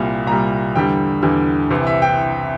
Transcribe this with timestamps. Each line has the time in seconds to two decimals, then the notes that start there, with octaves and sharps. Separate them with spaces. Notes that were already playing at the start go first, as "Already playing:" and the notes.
Already playing: C2 A#2 G3
0.27 C2 A#2 G3 A#5
0.76 E2 D3 G3 G5
1.22 E2 D3 G3
1.70 C2 C3 E3
1.87 E5
2.02 G5